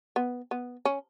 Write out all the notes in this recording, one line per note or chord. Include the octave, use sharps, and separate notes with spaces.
B3
B3
C#4